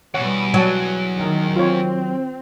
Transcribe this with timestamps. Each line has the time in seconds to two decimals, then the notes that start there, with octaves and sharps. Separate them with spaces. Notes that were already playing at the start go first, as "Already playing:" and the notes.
0.14 E2 B2 G3 B3 C#5 F#5
0.54 F#3 C#5 F#5 A5
1.18 D#3
1.56 C4 F4 C#5